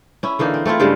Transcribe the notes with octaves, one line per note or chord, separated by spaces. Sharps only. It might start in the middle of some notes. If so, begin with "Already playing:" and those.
C#4 E4
D3 E3 A#3 D#4
C4
A3 C4 E4 F4
G2 C#3 G3 G#3